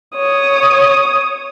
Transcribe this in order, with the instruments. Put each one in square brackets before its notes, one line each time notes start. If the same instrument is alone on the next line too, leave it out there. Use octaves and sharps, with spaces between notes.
[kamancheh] C#5 D#6